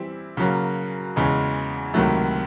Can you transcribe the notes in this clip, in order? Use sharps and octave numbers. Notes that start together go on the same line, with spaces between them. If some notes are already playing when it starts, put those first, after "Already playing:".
Already playing: E3 G3 C4 E4
C#3 F#3 A#3
E2 C#3 E3 G#3
C#2 C3 D#3 F#3 A3